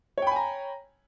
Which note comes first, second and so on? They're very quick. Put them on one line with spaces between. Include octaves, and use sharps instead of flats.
C#5 G5 B5 G#5 A#5